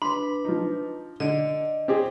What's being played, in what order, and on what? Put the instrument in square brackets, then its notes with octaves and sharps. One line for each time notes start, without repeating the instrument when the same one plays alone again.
[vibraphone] D4 B4 [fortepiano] B5 C6
[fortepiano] F3 D#4
[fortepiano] D3 [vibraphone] D5 D#5
[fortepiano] C4 G4 G#4